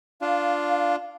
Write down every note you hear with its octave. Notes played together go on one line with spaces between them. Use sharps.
D4 F4 F5